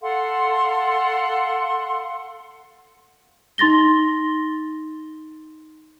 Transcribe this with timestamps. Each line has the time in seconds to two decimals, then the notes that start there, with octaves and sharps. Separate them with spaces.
0.02 A4 F5 F#5 C6
3.58 D#4 C6 A6 A#6 G7